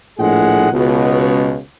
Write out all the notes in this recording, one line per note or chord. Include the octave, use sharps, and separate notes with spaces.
A#1 A2 G#3 G#4 F#5
C#2 B2